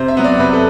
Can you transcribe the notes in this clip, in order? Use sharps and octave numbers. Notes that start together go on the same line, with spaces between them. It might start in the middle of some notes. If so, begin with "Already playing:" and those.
Already playing: C3 C5
E5
F#3 B3
D5
C3 B4
A4